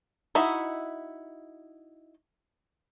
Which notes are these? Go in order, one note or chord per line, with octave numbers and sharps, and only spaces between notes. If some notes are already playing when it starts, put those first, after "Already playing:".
D#4 E4 F#4 E5